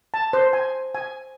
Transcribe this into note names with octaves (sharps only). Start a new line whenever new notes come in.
A5
C5
G#5
G#5